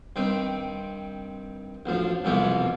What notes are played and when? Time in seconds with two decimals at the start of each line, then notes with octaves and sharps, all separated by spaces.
0.16 G2 D#3 C4
1.86 A1 D2 F3
2.24 C2 F2 B2 E3 F3 G#3